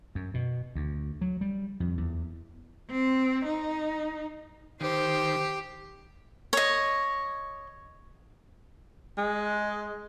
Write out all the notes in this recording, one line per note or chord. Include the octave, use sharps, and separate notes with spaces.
F#2
B2
D2
F#3
G3
F2
E2
C4
D#4
D#3 G4 C5
C#5 D#5
G#3